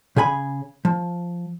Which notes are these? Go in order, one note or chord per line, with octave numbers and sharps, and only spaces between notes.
C#3 G#4 G#5 B5
F3